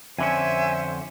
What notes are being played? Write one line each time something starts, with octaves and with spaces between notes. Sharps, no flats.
F2 D3 C#4 C5 E5 G#5